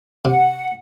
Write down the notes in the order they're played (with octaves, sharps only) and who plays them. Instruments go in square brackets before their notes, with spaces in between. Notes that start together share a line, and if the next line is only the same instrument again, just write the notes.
[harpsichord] C3 [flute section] F#5